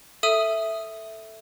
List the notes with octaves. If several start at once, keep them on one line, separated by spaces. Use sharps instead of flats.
A4 E5 D#6 D#7